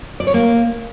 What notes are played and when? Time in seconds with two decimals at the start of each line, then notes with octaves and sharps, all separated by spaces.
0.20 D5
0.27 C#5
0.34 A#3